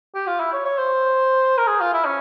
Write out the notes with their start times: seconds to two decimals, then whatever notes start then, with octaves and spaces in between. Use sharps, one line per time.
0.15 G4
0.27 F4
0.40 E4
0.53 C#5
0.65 C#5
0.78 C5
1.58 A#4
1.67 G#4
1.80 F4
1.93 E4
2.05 C#4